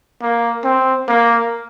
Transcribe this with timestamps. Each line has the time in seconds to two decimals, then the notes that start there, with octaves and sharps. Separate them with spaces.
0.22 A#3
0.64 C4
1.08 A#3